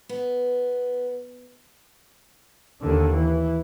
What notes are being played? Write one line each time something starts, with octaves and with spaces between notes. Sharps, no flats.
B3
D#2 D3
E3